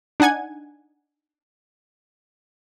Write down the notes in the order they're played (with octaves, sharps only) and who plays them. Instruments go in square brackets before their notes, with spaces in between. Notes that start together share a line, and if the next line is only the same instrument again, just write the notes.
[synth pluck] D4 D#4 F#5 G#5 G#6